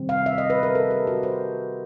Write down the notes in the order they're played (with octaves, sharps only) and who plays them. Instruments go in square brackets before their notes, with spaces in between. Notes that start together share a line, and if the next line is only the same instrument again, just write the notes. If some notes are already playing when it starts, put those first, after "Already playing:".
Already playing: [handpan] C3 D#3 G3 C4
F5
E5
D#5
B4
A#4
A4
G4
F#4
C5